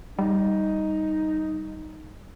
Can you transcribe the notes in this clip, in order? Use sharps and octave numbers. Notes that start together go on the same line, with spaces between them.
G3 D#4